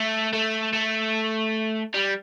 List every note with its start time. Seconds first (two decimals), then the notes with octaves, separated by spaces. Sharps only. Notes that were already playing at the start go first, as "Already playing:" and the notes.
Already playing: A3
0.33 A3
0.73 A3
1.94 G3